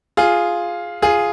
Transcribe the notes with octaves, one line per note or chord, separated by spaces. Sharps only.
F4 G#4
F4 G#4